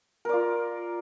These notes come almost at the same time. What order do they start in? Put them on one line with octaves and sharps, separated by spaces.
A#4 D5 F4